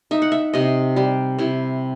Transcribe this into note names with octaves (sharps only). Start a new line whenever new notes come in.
D#4 E5
F#5
E5
C3 D#5
G3 G4
C3 E4